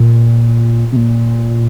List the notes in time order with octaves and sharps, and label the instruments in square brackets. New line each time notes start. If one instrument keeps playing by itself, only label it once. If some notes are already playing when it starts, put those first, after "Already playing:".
Already playing: [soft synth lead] A#2
C3
A#2